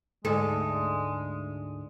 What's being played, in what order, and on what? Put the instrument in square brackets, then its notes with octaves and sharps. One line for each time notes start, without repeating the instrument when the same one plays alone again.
[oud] D2 G#2 A4 [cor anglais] G#3